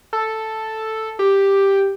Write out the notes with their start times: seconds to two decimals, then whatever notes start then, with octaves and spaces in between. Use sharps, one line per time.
0.13 A4
1.19 G4